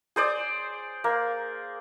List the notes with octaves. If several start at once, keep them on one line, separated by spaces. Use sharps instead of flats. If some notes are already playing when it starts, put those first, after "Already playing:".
G#4 C5 D5
A#3